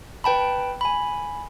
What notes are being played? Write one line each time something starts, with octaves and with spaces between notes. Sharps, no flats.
B4 G5 A5 B5
G#5 B5